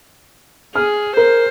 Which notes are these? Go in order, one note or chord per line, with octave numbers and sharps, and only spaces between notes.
G#4 F6
A#4 C5